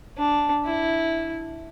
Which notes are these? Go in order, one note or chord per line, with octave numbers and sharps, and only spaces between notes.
D4
E4